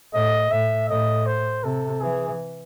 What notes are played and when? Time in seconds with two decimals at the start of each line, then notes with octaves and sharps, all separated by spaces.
0.13 A2 D#5
0.51 A2 E5
0.89 A2 D#5
1.26 C5
1.63 C3 A4
2.01 E3 G#4